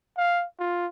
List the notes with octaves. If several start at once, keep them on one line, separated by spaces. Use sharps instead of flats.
F5
F4